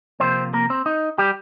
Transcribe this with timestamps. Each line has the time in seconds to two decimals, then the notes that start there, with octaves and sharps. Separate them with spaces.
0.20 C3 F3 A#3 C4 C5
0.53 A#3 A#4
0.70 C4
0.86 D#4
1.18 G3 G4